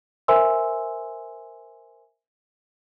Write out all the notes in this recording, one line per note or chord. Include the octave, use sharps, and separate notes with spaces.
A#4 C5 E5 G#5 C6 E6